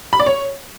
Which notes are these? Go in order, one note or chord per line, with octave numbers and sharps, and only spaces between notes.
B5
D5
C#5